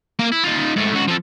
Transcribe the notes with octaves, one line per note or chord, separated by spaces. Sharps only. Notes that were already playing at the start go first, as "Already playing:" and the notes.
A#3 F5
E4
D#4 F4
G#2 A3
C#2 F#4
F3 A4